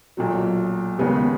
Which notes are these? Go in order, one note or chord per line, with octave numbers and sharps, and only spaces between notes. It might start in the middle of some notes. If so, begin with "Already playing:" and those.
B1 A#2 F#3
D#2 C#3 G#3 B3